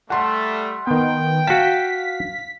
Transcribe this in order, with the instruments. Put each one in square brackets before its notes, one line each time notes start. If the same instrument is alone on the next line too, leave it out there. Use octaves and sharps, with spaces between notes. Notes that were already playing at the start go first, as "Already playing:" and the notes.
[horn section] G3 A3 [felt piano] F#5 C6
[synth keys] D#3 B3 [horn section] G5
[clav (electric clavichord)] F#4 A5 [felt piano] F5 [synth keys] B6